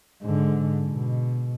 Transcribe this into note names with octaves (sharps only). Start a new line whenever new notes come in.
G#2 D3
B2